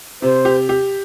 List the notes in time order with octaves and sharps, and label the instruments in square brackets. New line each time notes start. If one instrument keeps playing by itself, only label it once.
[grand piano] C3 [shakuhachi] C5
[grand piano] G4
G4